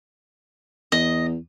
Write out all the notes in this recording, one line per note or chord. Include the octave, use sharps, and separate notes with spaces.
E2 D#5